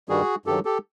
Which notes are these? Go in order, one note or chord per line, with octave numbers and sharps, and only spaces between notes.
G2 D#3 G3 F#4 G#4
G2 D#3 F#3 G4 A4
G4 A4